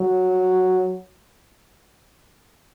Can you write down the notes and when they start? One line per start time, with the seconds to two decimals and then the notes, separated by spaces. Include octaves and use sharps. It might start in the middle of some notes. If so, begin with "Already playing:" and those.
Already playing: F#3